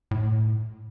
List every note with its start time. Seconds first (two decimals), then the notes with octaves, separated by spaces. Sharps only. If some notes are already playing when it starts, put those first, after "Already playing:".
0.11 A2